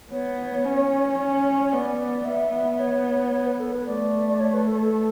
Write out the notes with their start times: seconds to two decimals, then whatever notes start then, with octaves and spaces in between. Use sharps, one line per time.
0.11 B3 C#5
0.64 C#4
1.18 C#4
1.62 C#5
1.72 B3 D5
2.25 B3 E5
2.79 C#5
3.32 C#5
3.47 B4
3.60 A4
3.73 B4
3.87 A3 D5
4.29 D5
4.40 C#5
4.54 B4
4.67 A4
4.80 A4